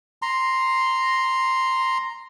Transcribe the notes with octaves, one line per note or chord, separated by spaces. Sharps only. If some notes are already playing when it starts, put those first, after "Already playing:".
A#5 C6